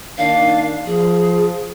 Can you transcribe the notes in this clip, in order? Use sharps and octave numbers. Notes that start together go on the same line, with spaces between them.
D#3 A#3 D4 F5
F3 G#4